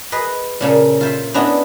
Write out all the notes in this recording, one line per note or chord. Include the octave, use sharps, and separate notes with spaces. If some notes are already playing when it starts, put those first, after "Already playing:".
G#4 B4 D#5
A#2 C#3 A#3 A4
F4 C5 E5
B3 C#4 D4 E4 D#5 E5